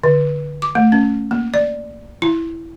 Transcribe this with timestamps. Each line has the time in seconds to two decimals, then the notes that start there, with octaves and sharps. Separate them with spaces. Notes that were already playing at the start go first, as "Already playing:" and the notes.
0.03 D3
0.62 D6
0.75 A3
0.92 C#4
1.31 A#3
1.54 D5
2.22 E4